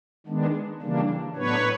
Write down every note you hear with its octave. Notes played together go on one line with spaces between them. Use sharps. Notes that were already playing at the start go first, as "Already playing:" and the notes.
D#3 G#3 B3 D4
C#3 E3 G3 A#3 D4
A2 F#3 B3 D4 B4 C#5